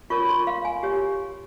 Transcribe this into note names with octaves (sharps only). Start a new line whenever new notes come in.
F4 A#4 C#5 C#6
C6
F5
G#5
G4 C#5